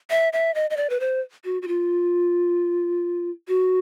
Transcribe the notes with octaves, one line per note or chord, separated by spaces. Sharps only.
E5
E5
D#5
D#5
D5
B4
C5
F#4
F#4
F4
F#4